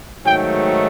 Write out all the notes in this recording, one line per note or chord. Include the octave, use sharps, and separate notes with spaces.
G#2 D#3 F#3 A3 G5